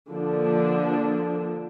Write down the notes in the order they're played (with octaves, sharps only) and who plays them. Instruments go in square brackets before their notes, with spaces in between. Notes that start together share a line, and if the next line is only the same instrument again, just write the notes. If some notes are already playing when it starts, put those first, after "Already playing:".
[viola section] D3 F3 A#3 D4